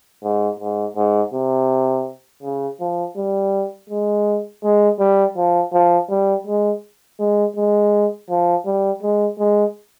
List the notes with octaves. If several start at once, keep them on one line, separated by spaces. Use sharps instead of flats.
G#2
G#2
G#2
C3
C#3
F3
G3
G#3
G#3
G3
F3
F3
G3
G#3
G#3
G#3
F3
G3
G#3
G#3